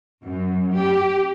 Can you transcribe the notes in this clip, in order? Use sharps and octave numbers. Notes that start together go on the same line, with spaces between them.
F#2
G4